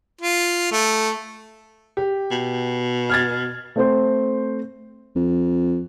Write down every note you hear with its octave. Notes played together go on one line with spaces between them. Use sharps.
F4
A3
G4
B2
F6 G#6 A6
A3 C4 C5
F2